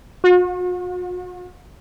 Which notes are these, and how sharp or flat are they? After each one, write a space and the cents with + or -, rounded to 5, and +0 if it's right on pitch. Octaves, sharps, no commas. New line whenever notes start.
F#4 -45